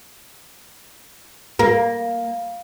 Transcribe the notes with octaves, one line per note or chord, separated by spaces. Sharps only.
A#3